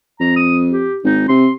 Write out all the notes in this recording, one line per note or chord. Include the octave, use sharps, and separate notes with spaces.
F2 A#5
D#6
G4
G#1 D#4
C3 C6